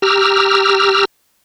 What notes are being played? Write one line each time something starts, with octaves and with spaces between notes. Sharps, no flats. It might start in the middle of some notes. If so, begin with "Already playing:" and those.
G4 A#5 E6 F6